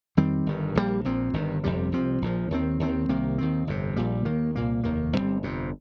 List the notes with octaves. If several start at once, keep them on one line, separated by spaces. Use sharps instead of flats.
F2 D#3 G3 C4
G1 G2 D#3
A#1 A#2 G3 A#3
A#1 A#2 F3 C4
G1 G2 D#3
G1 F2 C3 G3
C2 C3 F3 C4
A#1 A#2 F3
D#2 D#3 C4
D#2 D#3 C4
C2 C3 D#3 A#3
D#2 D#3 C4
G1 F2 C3
A#1 A#2 G3
D#2 D#3 A#3
C2 A#2 A#3
F1 D#2 D#3 A#3
G1 G2 G3 C4
G1 F2 C3